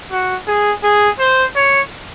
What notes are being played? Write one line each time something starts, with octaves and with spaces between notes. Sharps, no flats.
F#4
G#4
G#4
C5
C#5